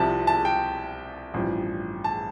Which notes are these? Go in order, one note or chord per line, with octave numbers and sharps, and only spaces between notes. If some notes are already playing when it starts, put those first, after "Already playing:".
Already playing: C2 C3 F3 A5
A5
G5
A1 G2 F3
A5